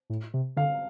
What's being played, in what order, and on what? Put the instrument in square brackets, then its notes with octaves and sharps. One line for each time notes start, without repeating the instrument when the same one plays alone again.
[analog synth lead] A2
C3
[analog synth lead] D3 [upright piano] F5